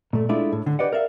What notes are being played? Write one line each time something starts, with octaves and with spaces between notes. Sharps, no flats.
A#2 A3
G#3 A3 D4 E4 F4
A2
D3
G4 B4 D5 D#5 F#5
A#4 D5 E5 F5